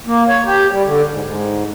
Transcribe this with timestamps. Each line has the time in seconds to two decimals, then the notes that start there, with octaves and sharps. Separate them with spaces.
0.07 A#3
0.29 C#5
0.46 G4
0.72 G3
0.86 D3
1.10 G#2
1.24 G#2